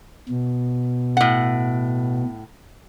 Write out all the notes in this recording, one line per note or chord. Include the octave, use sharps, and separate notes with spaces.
B2
A2 F#5